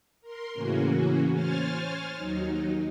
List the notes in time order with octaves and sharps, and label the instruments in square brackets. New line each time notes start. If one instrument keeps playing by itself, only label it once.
[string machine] A#4 C6
A2 C#3 E3 A#3 C#4 F#4
C5 C#5 G#5 F6 A6
D#2 F#3 D#4